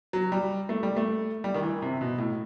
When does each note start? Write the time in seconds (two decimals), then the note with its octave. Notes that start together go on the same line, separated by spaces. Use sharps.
0.13 F#3
0.32 G3
0.69 A3
0.83 G3
0.97 A3
1.44 G3
1.54 D#3
1.63 E3
1.82 C3
2.01 B2
2.19 A2